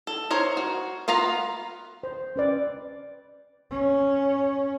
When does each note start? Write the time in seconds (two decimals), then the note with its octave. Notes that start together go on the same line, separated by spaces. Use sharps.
0.07 A4
0.31 A#4 C5 C#5
0.57 F#4
1.08 B3 F4 F5 A#5 B5
2.03 C5
2.36 C#4 B4 D5
3.71 C#4